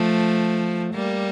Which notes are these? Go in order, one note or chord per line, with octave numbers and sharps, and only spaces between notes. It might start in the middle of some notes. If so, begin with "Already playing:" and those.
Already playing: F3 A3
G3 A#3